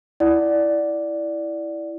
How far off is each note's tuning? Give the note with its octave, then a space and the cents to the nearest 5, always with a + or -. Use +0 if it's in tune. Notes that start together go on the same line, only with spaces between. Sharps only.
E4 +0 D5 +0 F#5 +0